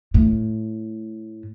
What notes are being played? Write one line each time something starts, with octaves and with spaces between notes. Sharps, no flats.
A2